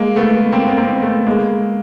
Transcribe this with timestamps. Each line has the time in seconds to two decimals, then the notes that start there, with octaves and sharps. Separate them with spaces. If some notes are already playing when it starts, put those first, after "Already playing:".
Already playing: G#3 A#3
0.16 A3 B3
0.52 A#3 C4
0.67 B3
0.77 A#3 C4
1.02 A3 B3
1.26 G#3 A#3